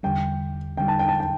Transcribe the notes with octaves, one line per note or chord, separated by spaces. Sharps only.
E2 D3 G3 G5
E2 D3 G3 G5
A5
G5
A5
G5